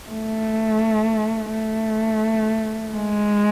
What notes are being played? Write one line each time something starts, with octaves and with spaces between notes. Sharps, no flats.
A3
A3
G#3